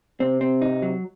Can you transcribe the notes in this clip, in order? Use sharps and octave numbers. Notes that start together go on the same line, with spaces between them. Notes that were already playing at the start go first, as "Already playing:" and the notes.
C3 C4
C4
D#4
F#3